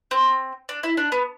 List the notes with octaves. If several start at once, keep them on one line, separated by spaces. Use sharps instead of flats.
C4
D4
E4
D4
B3